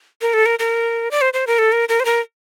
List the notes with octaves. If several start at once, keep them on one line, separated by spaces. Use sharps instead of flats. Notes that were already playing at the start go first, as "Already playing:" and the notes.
A#4
A4
A#4
A#4
D5
C5
C5
A#4
A4
A#4
A#4
C5
A#4